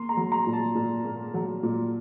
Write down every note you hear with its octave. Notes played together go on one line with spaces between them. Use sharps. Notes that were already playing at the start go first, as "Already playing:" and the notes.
Already playing: A#3 C6
A#5
F#3
A#5
A#2
A5
A#2
A#3
F#3
A#2